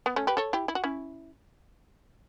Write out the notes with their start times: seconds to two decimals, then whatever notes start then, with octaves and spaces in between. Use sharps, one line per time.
0.06 B3
0.16 A3 C#4
0.27 G4 B4
0.37 A4 C#5
0.53 E4 G4
0.68 E4
0.75 F#4
0.84 C#4 E4